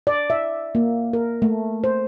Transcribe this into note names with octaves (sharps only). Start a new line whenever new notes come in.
D5
E5
A#3
A#4
A3
C5